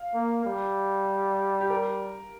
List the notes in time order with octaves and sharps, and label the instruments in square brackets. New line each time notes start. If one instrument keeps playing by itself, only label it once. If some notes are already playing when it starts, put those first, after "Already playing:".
Already playing: [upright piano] F5
[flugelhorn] A#3
G3
[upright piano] G4
A#4